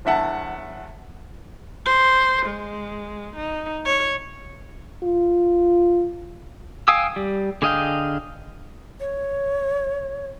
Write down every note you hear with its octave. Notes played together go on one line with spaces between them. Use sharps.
G1 E2 E5 F#5 A5
C5
G#3
D#4
C#5
F4
F5 G5 G#5 D#6 E6
G3
D3 G#4 D#5 F5 G5
C#5